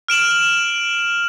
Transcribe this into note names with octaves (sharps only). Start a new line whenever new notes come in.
F6 D7 E7 F#7